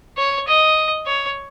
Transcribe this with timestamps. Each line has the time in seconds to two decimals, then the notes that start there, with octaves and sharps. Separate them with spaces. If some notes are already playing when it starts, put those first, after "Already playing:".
0.18 C#5
0.48 D#5
1.06 C#5